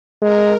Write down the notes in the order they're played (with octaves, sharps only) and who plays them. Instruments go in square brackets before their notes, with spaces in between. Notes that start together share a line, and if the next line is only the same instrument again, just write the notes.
[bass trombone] G#3 [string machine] A#4